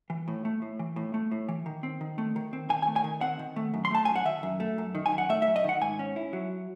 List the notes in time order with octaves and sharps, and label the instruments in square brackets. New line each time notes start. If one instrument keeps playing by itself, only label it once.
[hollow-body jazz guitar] E3
A2
A3
A2
E3
A2
A3
A2
E3
D#3
C4
D#3
A3
D#3
C4
D#3 G#5
G#5
A3
G#5
D#3
C4 F#5
D#3
A3
F#2
C6
A3 A5
F#2 G#5
F#5
D#3 E5
F#2
A3
F#2
D#3
G#5
F#2
F#5
A3 E5
E5
F#2
D#5
D#3 F#5
G#2 G#5
C#4
E4
F#3